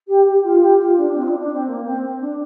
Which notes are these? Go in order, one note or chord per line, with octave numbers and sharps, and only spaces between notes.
G4
G4
F4
G4
F4
D4
C4
F4
D4
D4
C4
A#3
C4
C4
D4